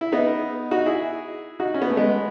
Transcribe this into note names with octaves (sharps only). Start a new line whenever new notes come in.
E4
B3 D#4
D#4 F#4
E4 G#4
D#4 F#4
C#4
B3
A3
G#3 B3